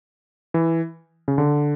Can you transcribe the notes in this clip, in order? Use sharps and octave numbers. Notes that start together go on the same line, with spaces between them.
E3
C#3
D3